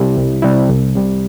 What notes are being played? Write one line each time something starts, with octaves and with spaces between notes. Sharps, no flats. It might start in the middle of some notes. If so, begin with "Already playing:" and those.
Already playing: C2 C3 G3 E4
C2
C3 G3 E4
C2
C3 G3